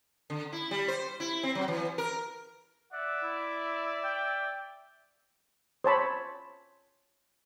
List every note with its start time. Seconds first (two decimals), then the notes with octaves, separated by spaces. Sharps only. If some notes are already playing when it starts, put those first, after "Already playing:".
0.30 D3
0.53 E4
0.71 G3
0.88 C5
1.20 E4
1.43 C4
1.55 F#3
1.68 E3
1.98 A#4
2.92 D5 E5 F#5
3.23 E4
4.04 G5
5.84 C5 C#5 A5 B5